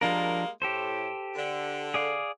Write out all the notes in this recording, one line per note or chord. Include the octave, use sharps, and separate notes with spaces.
F3 G3 G#3 A#3 D4 A#4
A2 G4 A4 C5
D3
G#4 D5 F5